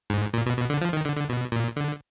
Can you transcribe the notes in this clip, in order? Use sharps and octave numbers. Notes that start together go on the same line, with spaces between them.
G#2
A#2
B2
B2
D3
F3
D#3
D3
D3
B2
A#2
D3